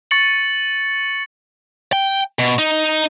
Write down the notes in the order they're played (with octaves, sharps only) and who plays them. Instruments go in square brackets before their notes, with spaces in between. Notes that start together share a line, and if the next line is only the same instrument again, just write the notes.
[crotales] C#6 A6 C#7 F#7
[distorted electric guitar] G5
B2
D#4